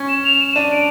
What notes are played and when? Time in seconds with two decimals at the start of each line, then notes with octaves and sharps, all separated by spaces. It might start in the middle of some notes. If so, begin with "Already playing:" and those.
Already playing: C#4
0.09 E7
0.24 F7
0.40 E7
0.56 D4 D#7
0.72 D7